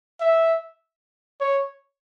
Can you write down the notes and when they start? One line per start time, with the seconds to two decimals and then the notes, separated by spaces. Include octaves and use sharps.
0.21 E5
1.41 C#5